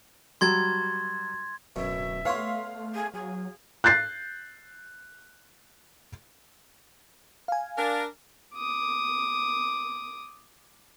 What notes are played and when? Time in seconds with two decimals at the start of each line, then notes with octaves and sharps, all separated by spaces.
0.41 F#3 G3 F#4 C6 G#6 A6
1.76 D1 F#2 B2 E5
2.25 A3 B3 C#5 F5 F#5 C6
2.94 G#4
3.14 F#3 G#4
3.84 F#6 G6 A6 C7
7.48 F5 G#5
7.77 D4 A#4
8.56 D6 D#6